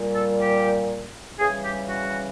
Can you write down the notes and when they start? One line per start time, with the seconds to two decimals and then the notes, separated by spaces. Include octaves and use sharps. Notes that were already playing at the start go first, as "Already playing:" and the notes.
Already playing: A#2 G3
0.15 A4
0.41 G4
1.40 C#3 E3 G3 G#4
1.64 G4
1.89 F#4